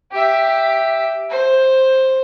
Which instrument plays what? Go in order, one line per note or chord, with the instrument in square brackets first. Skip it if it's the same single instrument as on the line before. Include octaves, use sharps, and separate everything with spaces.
[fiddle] G4 E5
C5